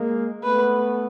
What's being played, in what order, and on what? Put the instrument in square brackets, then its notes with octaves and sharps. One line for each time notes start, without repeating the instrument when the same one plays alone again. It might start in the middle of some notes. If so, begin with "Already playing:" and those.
Already playing: [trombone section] G#3 A#3
[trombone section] A3 B3 [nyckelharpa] B4